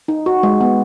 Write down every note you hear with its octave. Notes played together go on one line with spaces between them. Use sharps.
D#4
F#4
G#3
B3